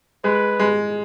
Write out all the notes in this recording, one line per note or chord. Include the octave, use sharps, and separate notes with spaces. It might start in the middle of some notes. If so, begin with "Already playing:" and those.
G#3 B4
G#3